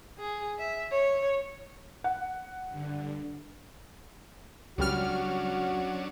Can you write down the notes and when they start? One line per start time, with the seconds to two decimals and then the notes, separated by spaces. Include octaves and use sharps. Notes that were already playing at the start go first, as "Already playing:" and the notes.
0.18 G#4
0.58 E5
0.92 C#5
2.04 F#5
2.69 G2 D3
4.78 C#2 F#3 G3 C#4 D4 F#4 F6